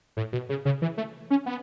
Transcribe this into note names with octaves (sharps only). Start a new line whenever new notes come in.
A2
B2
C#3
C#3
E3
A3
C#4
B3